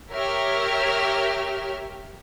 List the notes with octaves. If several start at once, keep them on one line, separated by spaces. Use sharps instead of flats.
G4 A#4 C#5 E5 F6